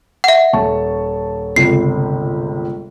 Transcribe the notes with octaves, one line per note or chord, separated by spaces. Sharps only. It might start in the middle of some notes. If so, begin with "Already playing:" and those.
E5 F#5
D#1 A5 C#6
G1 C#2 C3 C7